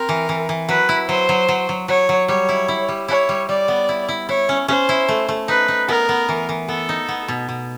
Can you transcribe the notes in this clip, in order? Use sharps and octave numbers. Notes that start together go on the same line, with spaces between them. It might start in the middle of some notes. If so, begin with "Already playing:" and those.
Already playing: C4 A#4
E3
E3
E3
F#3 B4
E4
F#3 C5
F#3
F#3
F#3
F#3 C#5
F#3
G3 C#5
E4
E4
G3
E4 C#5
G3
G3 D5
B3
E4
E4
E4 C#5
C#4
C#4 C5
E4
A3
A3
D#4 B4
D#4
B3 A#4
B3
E3
E3
B3 A4
D#4
B3
B2
B2